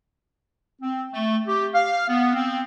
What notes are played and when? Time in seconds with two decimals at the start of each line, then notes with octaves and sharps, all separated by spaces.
0.82 C4
1.13 A3
1.48 G4
1.74 F5
2.08 B3
2.35 C4